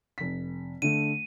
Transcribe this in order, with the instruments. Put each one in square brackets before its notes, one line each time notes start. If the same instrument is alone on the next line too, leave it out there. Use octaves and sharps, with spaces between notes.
[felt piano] F1 B6
[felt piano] D3 A3 [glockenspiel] D#7